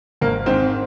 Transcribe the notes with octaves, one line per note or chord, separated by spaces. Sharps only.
G#1 A#3
G#2 D#3 C4